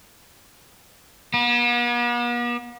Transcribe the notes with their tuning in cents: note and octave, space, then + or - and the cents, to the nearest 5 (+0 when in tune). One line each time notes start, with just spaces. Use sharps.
B3 -45